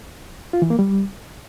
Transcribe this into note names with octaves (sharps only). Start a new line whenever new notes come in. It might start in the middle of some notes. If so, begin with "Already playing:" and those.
F4
E3
A#3
G3